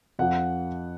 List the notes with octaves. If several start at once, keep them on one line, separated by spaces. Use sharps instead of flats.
F2 F3 F#5